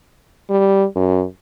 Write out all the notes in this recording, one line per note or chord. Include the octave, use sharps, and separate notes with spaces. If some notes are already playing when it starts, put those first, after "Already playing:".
G3
F#2